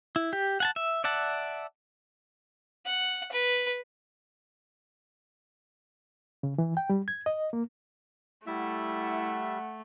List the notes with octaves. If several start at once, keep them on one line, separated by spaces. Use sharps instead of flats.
E4
G4
F#5 G#5 A5
E5
D5 E5 F#5 A5
F#5
B4
C#3
E3
G5
G3
G#6
D#5
A#3
G3 A3 E4 E5 F#5